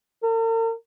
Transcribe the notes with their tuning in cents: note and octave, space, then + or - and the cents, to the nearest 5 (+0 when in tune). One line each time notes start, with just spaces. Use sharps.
A#4 -45